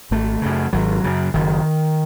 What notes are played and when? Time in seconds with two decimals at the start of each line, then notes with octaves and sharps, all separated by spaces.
0.11 G#1 A3
0.42 F#2 C#3
0.73 G#1 F#3
1.04 F#2 C#3
1.34 F#1 D#3